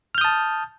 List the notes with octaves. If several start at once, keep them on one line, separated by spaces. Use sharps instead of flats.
A5 D#6 F6 G6